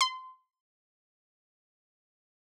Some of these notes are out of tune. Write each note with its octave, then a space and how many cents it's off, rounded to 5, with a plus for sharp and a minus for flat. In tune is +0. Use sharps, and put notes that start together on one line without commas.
C6 -20